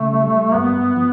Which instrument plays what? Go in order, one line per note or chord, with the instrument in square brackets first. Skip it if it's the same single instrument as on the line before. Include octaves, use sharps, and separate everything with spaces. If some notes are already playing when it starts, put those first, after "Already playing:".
Already playing: [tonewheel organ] C#3 [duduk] A3
[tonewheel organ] G3
[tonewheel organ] G2 [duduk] B3
[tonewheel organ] F3